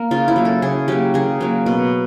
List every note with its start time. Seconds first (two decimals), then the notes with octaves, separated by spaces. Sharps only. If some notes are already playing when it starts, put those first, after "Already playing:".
Already playing: A#3 A#4
0.11 C#3 F4
0.28 E4
0.36 F#3 A#3
0.45 A4
0.62 C#3 G#4
0.88 F#3 A#3 G4
1.14 C#3 G#4
1.41 F#3 A#3
1.66 B2